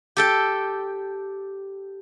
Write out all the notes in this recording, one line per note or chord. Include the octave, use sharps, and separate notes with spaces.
G4 A4 G5